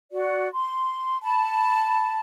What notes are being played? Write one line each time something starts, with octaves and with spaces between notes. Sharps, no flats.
F#4 D5
C6
A5 B5